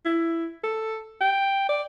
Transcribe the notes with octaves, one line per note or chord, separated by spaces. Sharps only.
E4
A4
G5
D5